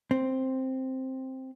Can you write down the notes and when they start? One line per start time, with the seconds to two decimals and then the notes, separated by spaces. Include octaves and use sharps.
0.11 C4